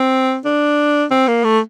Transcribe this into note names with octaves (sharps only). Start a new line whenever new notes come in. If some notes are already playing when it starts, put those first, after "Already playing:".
Already playing: C4
D4
C4
A#3
A3